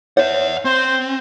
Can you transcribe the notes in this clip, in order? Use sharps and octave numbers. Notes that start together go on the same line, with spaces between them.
C#5 E5 F#5
C4 C5